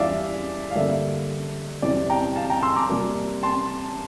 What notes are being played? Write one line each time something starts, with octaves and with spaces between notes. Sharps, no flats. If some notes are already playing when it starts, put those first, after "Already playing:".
Already playing: E2 E3 G3 D4 F4 D5 E5 F5
F5
G2 D3 G3 A#3 D4 E5
E2 C3 E3 G3 C4 D5
G5 A#5
F5 A5
G5 A#5
C6 E6
A#5 D6
C3 G3 A#3
A5 C6